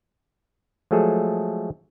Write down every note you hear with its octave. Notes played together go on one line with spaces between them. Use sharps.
F3 F#3 G#3 A3 G#4 A4